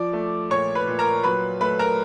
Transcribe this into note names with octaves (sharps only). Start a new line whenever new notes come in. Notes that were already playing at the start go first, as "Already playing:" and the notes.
Already playing: F3 D5 D6
A3
A#2 C#5 C#6
B4 B5
A#2
A#4 A#5
F#3 B4 B5
A3 B4 B5
A#4 A#5